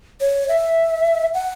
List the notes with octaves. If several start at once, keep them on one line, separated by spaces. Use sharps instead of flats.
C#5
E5
F#5